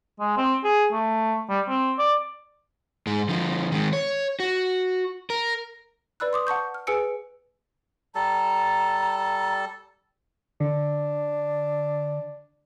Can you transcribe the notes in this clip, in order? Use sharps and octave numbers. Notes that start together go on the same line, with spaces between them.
G#3
C4
G#4
A3
G3
C4
D5
G#2 G#3
D3 F3
D#3 G#3
C#5
F#4
A#4
B4 D5 B5 E6 F#6
C6 D6 D#6
F#5 A5 C#6 G6
F6
G#4 B4 G#5 E6 C#7 D7
G3 A4 A5 A#5
D3 D4